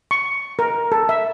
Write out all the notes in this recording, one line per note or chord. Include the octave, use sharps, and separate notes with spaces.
C#6
A#4
A4
E5